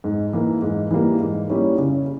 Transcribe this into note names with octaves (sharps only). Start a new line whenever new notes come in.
G#2
E3 A#3
G#2
E3 G3 A#3
G#2
G3 A#3 C#4 E4
C#3